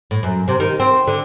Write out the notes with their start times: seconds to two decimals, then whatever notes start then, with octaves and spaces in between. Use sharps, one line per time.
0.11 A2
0.23 F#2
0.48 C3
0.60 D#3
0.80 C4
1.07 D3